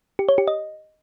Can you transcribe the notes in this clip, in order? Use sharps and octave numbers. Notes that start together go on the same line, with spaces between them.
G4
C#5
G4
D#5